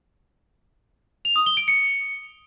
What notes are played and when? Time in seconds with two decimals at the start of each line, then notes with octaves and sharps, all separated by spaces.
1.25 F7
1.36 D#6
1.46 G7
1.57 D7
1.68 C#7